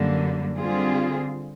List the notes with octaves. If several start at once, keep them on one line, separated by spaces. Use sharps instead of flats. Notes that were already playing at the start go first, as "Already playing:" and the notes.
Already playing: F#2 D3 G3 A#3
D3 G3 C4 F4 G#4